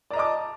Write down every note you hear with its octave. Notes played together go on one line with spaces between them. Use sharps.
D5 D#5 A5 A#5 D6